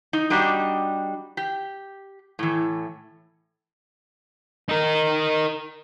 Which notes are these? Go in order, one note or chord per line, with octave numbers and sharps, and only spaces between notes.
D#4
G3 D4 D#4 F#4 G4
G4
A2 E3
D#4 A#4